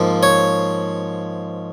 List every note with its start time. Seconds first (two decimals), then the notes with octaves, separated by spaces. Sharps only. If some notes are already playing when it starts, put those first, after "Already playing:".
Already playing: G#2 F3 A#3
0.23 C#5